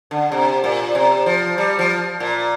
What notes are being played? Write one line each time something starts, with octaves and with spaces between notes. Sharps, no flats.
D3
C3
A#2
C3
F3
G3
F3
A#2